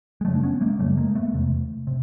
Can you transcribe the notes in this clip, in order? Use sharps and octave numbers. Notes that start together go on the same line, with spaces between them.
G#3
F#2 C#3 G3 A3
D4
B3 C#4
G#3 A#3
F#2 C#3 G3 A3
G#3 A#3
A3 B3
E2 C3
C3